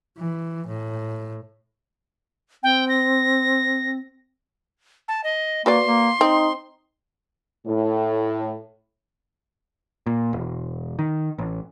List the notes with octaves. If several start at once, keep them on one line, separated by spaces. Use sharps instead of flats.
E3
A2
C4 G5
A#6
A5
D#5
A#3 F#4 B4 D5 C6
A#3
C4 D#4
A2
A#2
E1
D#3
A1